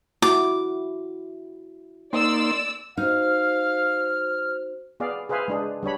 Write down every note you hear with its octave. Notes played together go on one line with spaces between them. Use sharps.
E4 F#4 D6
A#3 D#4 D5 C6 E6
D#4 F#4 C5 F5 F6
B3 G#4 D5 F5
G#4 B4 C5 E5 F5 G#5
G#3 D4 G#4
G3 D4 C#5 B5